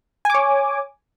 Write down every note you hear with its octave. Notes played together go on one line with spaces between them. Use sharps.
C#5 G#5 D6